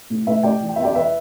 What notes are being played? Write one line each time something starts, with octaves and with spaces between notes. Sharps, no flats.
A2
A2 B4 E5
A3 D5 G5
E3
G5
B3 E5
D5 G5
E2 B4 E5